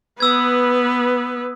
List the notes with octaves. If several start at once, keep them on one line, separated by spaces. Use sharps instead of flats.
B3 B4 D#6 E6 G#6